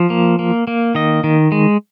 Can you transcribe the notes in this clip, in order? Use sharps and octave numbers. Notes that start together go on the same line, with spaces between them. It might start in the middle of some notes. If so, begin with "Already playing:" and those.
Already playing: F3
A#3
A#3
A#3
D#3 D#5
D#3
G#3